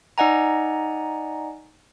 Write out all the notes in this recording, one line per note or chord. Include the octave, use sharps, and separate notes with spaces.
D#4 D5 D#5 F#5 G#5 A#5